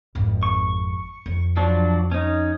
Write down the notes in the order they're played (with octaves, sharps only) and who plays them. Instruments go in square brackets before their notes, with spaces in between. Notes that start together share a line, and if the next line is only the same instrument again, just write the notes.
[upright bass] G#1 F2
[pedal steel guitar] C#6
[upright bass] F2
[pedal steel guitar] F3 F#3 D4
C#4 D#4